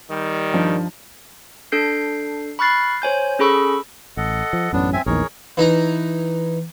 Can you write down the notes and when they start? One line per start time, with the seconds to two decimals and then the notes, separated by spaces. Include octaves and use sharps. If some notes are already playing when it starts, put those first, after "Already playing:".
0.10 D#3 G3
0.54 G2 F3 D#4
1.72 D4 A4 G6 C7
2.59 B5 C#6 F6 F#6 A6 C7
3.02 C5 C#5 G#5 G6
3.39 C#4 G#4 A4 B5 C#6 E6
4.17 A1 A4 D#5 F#5
4.53 F3
4.73 A1 F#2 B3 C#4 D4
4.93 C4 E5 G#5
5.06 A#1 E2 D#3 G#4 A#4 C#5
5.57 E3 D#4 D#5 A#5